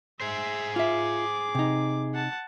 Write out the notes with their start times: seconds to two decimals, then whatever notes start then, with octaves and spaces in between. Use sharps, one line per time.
0.20 G#4 C5 E5
0.76 F4 E5 D6
1.55 C3 D#4
2.15 F#5 A5